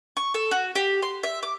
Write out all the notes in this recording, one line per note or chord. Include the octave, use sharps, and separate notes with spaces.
C#6
A4
F#4
G4
C6
E5
D6